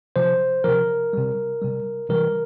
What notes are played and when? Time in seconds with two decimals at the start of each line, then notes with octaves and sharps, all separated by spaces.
0.16 C3 F3 C5
0.64 C3 F3 A#4
1.13 C3 G3
1.61 C3 G3
2.09 C3 E3 G3 A#4